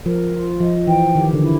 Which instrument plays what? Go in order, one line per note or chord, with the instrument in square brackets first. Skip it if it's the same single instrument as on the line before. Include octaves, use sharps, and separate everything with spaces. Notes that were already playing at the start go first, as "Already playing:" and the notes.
[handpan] F3 [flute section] A#4
[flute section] F4
[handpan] F3 [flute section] D#5
[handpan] E3 [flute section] G5
[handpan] D#3 [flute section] G4
[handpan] D3
[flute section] E4